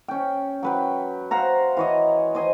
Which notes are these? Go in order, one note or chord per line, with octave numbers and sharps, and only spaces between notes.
C#4 G5
F#3 B4 G5
C5 F5 F#5 A#5
E3 C#5 D#5
C5 D#5 G#5